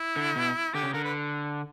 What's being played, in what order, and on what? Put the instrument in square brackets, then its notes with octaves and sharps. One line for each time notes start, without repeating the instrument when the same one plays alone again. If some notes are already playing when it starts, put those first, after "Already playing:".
Already playing: [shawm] E4
[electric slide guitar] D3
B2
[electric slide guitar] D3 [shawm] G4
[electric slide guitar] C#3
[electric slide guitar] D3 [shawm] A#4
[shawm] B4